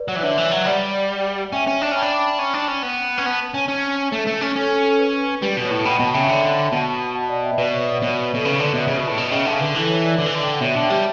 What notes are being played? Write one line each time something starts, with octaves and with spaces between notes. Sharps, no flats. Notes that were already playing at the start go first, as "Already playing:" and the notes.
Already playing: B4 D5
F#3
E3
D3 C#5 E5
E3
F#3
G3 D5 F#5
C#4 E5 G5
C#4
D4
A5
C#4 G5 B5
D4
G5 B5
C#4
D4
C#4
B3
C#4
B3 F#5 A5
C#4 C#5
C#4
A3
A3
C#4
C#4 A4
A4
A4
B4
G3 B4
B2
C#5
A2
B2 G5 B5
B2 F#5 A5
C#3 E5 G5
D3 C#5 E5
B2 F#5 A5
F#5 A5
D5 F#5
E5 G5
B2 B4 D5
C#5 E5
B4 D5
B2 C#5
B4
B4
B2 A4
C#3 B4
D3 B4 D5
B2 C#5 E5
C#3
B2
A2
B2
C#3 E5 G5
D3 F#5 A5
C#3
D3 B4
E3 A4
C#5
B4 D5
D3
E3
D3
G5
F#5
B2 C#5 E5
D3 A5
E5 G5
G3